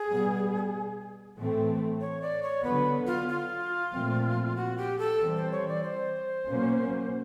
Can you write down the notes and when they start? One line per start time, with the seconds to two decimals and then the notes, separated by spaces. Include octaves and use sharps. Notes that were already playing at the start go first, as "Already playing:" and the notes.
Already playing: G#4
0.09 B2 G3 B3
1.36 A2 E3 A3 C4
2.01 C#5
2.22 D5
2.43 C#5
2.64 D3 F#3 B3 B4
3.07 F4
3.28 F4
3.92 A#2 F3 A3 C4
4.56 F#4
4.78 G4
4.99 A4
5.20 E3 G3 C4
5.36 C5
5.52 C#5
5.68 D5
5.84 C5
6.48 B2 F#3 A#3 C#4